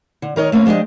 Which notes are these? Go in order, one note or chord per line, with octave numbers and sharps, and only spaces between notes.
D3
D#3 A#4 C#5 D#5
A3 A#3 C4 C#4
F3 G#3 D4 G4 D#5